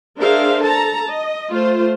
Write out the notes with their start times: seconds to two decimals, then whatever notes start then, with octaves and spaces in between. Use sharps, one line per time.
0.20 D4 G#4 A#4 C5 E5 F5
0.60 A4 A5 A#5
1.07 D#5
1.51 A3 F4 C5